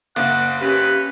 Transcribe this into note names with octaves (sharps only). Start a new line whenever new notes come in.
F#1 A#3 F#5
C#4 G4 B4